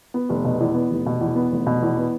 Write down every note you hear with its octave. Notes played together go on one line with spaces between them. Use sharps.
B3
F1
B2
E2
B3
F1
B2
E2
B3
F1
B2
E2
B3